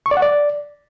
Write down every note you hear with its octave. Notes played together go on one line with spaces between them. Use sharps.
C#6
D5
F#5
D5